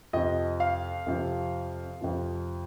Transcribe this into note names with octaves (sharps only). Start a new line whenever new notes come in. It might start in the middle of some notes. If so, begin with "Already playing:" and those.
F2 C3 F3 D#5
F5
F2 C3 F3
F2 C3 F3